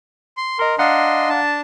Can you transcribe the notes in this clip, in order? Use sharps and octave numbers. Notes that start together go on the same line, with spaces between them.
C6
A#4 D#5 C6
D4 D#5 F5 F#5 A#5 C6
D4 A5